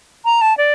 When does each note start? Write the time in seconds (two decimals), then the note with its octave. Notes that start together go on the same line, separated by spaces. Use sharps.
0.25 A#5
0.41 A5
0.58 D5